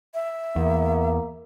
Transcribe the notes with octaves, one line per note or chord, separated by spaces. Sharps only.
E5
E2 A#3